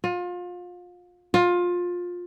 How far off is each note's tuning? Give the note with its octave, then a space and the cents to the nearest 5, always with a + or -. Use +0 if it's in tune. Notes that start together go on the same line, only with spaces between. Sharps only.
F4 +30
F4 +20